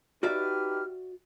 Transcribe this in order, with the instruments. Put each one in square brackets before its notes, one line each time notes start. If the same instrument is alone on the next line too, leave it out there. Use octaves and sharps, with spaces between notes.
[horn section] D#4 G4 B4 [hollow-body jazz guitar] F#4 D5 E5 [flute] F6